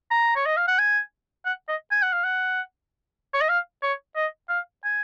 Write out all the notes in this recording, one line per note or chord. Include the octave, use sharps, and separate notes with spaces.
A#5
C#5
D#5
F5
F#5
G#5
F#5
D#5
G#5
F#5
F5
F#5
C#5
D#5
F5
C#5
D#5
F5
G#5